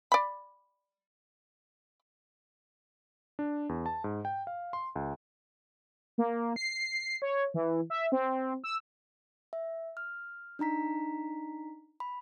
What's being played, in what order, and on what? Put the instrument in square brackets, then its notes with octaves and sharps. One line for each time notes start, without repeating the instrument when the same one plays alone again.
[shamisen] D5 B5
[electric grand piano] D4
E2
A5
G#2
G5
F5
C6
C#2
[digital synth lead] A#3
C7
C#5
E3
E5
C4
E6
[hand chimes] E5
F6
D4 D#4 A#5 B6
B5